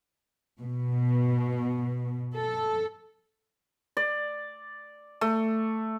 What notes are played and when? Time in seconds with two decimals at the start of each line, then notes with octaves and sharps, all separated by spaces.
0.60 B2
2.34 A4
3.97 D5
5.21 A3